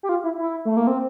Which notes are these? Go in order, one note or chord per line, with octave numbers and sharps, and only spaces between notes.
G4
F4
E4
E4
A3
A#3
C4